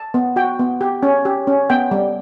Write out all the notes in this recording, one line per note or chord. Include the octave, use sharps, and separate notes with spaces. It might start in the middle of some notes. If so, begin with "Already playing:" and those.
Already playing: A5
B3
F#4 G5
B3
G4
C#4
G4
C#4
B3 G5
G3